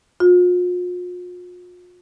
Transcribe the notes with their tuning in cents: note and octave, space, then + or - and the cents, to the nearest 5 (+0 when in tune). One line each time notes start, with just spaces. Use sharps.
F4 +40